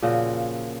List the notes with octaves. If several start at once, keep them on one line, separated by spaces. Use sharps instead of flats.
A#2 C#3 F3 F#4